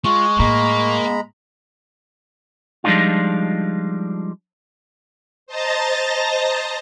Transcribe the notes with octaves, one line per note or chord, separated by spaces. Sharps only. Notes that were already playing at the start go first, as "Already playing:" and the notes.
G#3 F4 C#6
A2 G#3 A#3 A#5 B5
F3 G3 G#3 D4 D#4 F4
C5 D#5 A5 A#5 A6 A#6